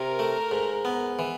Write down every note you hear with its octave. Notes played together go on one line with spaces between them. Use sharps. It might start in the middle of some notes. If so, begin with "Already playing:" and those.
Already playing: C3 A#4
A3
G#2
B3
E3